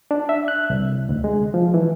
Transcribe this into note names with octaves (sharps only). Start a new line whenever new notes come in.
D4
E5
F#6
C2
D2
G#3
F3
E3